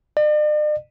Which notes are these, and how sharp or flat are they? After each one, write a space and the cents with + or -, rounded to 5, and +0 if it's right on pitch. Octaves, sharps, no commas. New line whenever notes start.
D5 +45